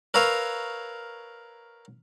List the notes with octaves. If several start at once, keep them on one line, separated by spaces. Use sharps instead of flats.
A#4 B4 C#5 E5 F5